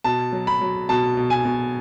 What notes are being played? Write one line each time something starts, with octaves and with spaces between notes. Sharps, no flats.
B2 A5
F#3
B5
F#3
B2 A5
B2
G#5
B2